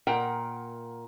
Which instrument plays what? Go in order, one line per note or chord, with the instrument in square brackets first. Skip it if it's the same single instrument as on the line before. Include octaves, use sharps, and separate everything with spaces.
[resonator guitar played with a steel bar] A#2 A#4 F#5 G5